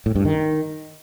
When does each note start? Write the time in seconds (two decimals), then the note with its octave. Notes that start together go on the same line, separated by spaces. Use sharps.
0.06 A2
0.16 G2
0.25 D#3